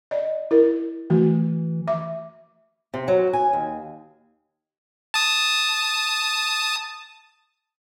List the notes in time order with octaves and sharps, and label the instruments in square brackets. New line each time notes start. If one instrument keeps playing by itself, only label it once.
[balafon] D5 D#5
E4 A#4
[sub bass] E3 [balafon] A3 F#4
[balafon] E5 D6
[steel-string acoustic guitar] C3
F#3
G#5
D#2
[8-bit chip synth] A5 D#6